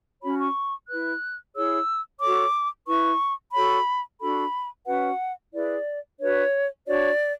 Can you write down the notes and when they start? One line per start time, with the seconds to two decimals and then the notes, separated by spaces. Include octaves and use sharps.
0.22 C#4 F#4 C#5 B5
0.39 C#6
0.89 E4 B4 F#6
1.55 E4 G#4 C#5 E6
2.21 F#4 A4 C#5 D6
2.88 E4 B4 C#6
3.54 F#4 A4 C#5 B5
4.21 D4 F#4 A4 B5
4.86 C#4 F#4 B4 F#5
5.53 E4 G#4 B4 D5
6.19 D4 F#4 B4 C#5
6.86 D4 F#4 C#5 D5